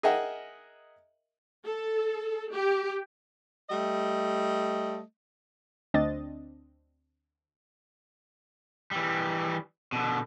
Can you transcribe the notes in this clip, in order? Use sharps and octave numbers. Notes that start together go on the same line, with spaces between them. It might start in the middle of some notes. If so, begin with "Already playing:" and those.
G#4 A#4 D#5 E5 F#5 G5
A4
G4
G3 A3 D#5
D2 C4 D4 D#5 A6
E3 G3
B2 D3